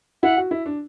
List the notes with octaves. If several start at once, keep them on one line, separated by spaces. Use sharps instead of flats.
E4 F#5
F#4
E4
D4